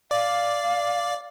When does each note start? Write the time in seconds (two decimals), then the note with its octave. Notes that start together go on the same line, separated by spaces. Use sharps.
0.11 D5 F5